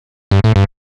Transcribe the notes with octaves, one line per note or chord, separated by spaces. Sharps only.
G2
A2
G2